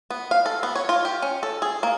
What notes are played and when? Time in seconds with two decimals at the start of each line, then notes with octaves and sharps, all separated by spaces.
0.10 B3
0.31 F5
0.46 A4
0.63 B3
0.75 C#5
0.89 F4
1.05 G4
1.22 C#4
1.43 A4
1.62 G#4
1.83 A#3